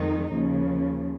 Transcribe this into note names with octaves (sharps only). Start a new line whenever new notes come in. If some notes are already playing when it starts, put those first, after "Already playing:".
Already playing: F2 D#3 G#3 D#4
D#2 C#3 F3